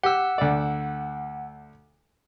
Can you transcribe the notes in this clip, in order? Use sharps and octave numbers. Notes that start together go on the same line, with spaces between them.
G4 F#5 E6
D2 D5